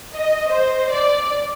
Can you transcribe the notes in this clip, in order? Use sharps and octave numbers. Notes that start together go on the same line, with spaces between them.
D#5
C5
D5